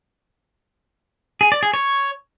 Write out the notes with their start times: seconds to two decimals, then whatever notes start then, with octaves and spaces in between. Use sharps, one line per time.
1.41 G#4
1.52 D5
1.63 G#4
1.74 C#5